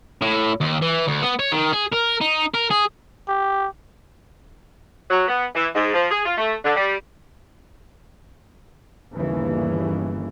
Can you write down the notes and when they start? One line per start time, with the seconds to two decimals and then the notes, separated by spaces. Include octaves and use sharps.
0.22 A2
0.61 D#2
0.82 E3
1.07 D2
1.22 B3
1.39 C#5
1.52 D#3
1.73 G#4
1.93 A#4
2.21 D#4
2.54 A#4
2.71 G#4
3.28 G4
5.10 F#3
5.28 B3
5.55 E3
5.75 G#2
5.94 F3
6.11 G#4
6.25 F4
6.38 A3
6.65 D3
6.76 G3
9.13 G1 D#2 C#3 E3